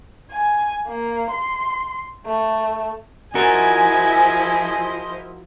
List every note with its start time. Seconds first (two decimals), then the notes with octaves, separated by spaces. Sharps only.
0.31 G#5
0.87 A#3
1.31 C6
2.26 A3
3.35 F3 E4 F#4 G#4 A#4 C5 D#5 G#5